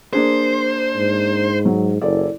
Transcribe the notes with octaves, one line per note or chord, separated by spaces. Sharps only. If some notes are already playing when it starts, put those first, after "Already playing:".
A#3 D4 G#4 C5
G#2
F#3
F#1 E4 A4 D5